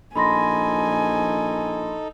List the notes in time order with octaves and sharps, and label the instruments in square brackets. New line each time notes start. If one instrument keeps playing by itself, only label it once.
[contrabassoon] A#1 [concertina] D#4 A4 [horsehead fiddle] G#5 [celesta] B5 C6 A#6